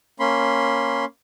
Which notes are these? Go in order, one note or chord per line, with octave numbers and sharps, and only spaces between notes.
A#3 C#4 B5 C6